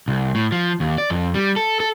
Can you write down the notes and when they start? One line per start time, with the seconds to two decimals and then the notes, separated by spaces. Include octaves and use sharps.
0.08 C2
0.35 A2
0.52 F3
0.80 D#2
0.98 D5
1.10 F2
1.34 G3
1.56 A4
1.80 A4